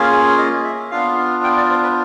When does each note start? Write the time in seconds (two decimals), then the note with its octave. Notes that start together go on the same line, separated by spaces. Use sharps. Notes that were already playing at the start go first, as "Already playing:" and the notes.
Already playing: A#3 C#4 F4 G#4
0.38 D#5
0.64 E5
0.91 B3 D4 F4 F5
1.44 G5
1.57 D5
1.70 C5
1.83 B4